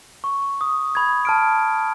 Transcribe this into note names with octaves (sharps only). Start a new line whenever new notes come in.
C#6
D#6
B5 G#6
A5 F6 D7